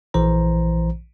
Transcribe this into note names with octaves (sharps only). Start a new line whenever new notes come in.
A#1 E3 C5 A#5